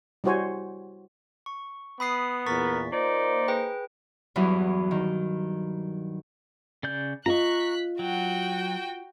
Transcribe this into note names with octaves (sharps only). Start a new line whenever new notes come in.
G3 E4 F#4 C5 C#5 G#5
C#6
B3 B5 D#6 C7
E2 A#2 A#4 C#6 A6 B6
A#3 D#4 F4 C5 D5
G#4 B4 G5
E2 G2 E3 F#3 E4
D#3
C#3 D5 G6
F4 D#5 A#5 C#6 F#6 B6
F#3 F#4 G5